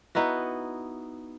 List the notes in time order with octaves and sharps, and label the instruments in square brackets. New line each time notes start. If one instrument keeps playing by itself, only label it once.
[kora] B3 D#4 E4 F#4